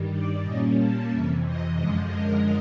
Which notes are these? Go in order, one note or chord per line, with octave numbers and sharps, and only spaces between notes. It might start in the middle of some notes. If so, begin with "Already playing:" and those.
Already playing: G2 D#3 G3
D5
A#2 G3 A#3 C#4 D#5
A5
F2 C3 E3 E5
D#5
F#2 D3 F3 G#3 D#5
A#4